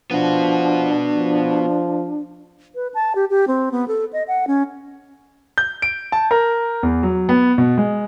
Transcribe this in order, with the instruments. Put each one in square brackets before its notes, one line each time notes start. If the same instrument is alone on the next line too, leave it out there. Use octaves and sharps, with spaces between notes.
[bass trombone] F3 [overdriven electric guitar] B3 F#4 [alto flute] D4
[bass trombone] F3
[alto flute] B4
A5
G4
G4
C4
B3
A4
D#5
F#5
C#4
[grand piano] G6
D7
A5
A#4
E2
F#3
B3
B2
G#3